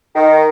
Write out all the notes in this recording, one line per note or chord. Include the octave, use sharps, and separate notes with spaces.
D#3